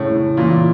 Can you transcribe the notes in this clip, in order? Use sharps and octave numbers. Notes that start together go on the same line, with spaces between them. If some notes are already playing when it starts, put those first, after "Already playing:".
Already playing: A2 C#3
A#2 E3